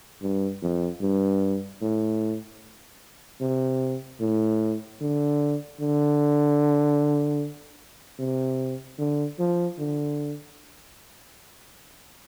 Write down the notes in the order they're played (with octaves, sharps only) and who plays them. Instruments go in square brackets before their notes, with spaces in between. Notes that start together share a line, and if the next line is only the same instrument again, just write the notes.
[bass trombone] G2
F2
G2
A2
C3
A2
D3
D3
C3
D3
F3
D3